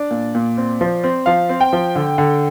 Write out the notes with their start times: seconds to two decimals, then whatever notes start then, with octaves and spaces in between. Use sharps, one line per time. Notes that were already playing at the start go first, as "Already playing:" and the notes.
Already playing: D4 D5
0.11 A#2
0.35 A#2
0.57 C4
0.81 F3
1.04 C4
1.26 F3 F5
1.49 C4
1.61 G5
1.73 F3
1.95 D3
2.18 D3